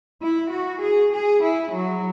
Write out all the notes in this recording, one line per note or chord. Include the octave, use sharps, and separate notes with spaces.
E4
F#4
G#4
G#4
E4
F#3